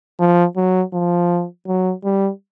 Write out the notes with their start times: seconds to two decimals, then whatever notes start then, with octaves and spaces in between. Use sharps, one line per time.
0.19 F3
0.56 F#3
0.93 F3
1.67 F#3
2.04 G3